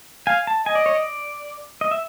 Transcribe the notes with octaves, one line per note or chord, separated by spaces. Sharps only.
F5 G#5
A5
D#5 G#5
D5
C#5
D5
D#5
E5